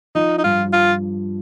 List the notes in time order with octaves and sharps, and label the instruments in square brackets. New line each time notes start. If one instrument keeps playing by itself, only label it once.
[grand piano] F3 [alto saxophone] D#4
[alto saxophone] D#4
[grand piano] G2 [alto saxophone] F4
[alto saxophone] F4